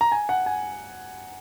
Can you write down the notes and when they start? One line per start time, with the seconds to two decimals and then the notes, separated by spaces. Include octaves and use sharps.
0.01 A#5
0.12 G#5
0.29 F#5
0.46 G#5